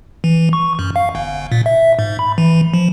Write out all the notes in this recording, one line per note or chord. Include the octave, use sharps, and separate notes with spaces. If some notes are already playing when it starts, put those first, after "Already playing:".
E3
E3
C#6
F#2
F5
G1
A#2
E5
G#2
B5
E3
F3